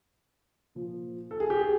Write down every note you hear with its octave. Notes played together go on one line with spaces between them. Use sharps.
A#2 F3
A4
G#4
G4
G#4